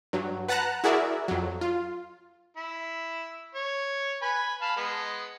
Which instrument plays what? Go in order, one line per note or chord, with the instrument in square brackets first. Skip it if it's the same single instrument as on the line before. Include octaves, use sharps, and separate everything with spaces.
[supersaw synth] G2 F#3
B4 F#5 A5 A#5 F#6
E4 F#4 G#4 A#4 D5 E5
F2 F#3
F4
[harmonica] E4
C#5
B4 G#5 B5
F5 A5 B5
G#3 B3